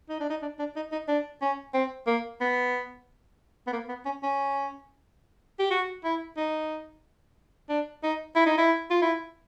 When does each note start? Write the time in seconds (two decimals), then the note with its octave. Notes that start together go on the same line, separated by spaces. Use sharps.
0.09 D#4
0.20 D4
0.30 D#4
0.42 D4
0.59 D4
0.76 D#4
0.92 D#4
1.08 D4
1.41 C#4
1.74 C4
2.07 A#3
2.41 B3
3.67 B3
3.73 A#3
3.89 B3
4.05 C#4
4.23 C#4
5.59 G4
5.70 F#4
6.04 E4
6.37 D#4
7.69 D4
8.03 D#4
8.36 E4
8.46 D#4
8.58 E4
8.90 F4
9.02 E4